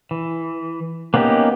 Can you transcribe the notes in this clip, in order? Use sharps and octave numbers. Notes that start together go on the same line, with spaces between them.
E3
A#3 B3 C#4 D#4 G4